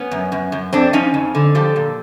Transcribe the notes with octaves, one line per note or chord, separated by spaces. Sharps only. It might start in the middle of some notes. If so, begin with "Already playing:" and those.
Already playing: B3 C#4
F#2
F#2
F#2
F2 C4 D4
F3 C#4 D#4
F2
D3
F3 G4 A4
A#2